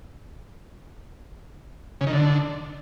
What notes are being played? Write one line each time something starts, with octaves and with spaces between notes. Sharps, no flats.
C#3
D#3
D3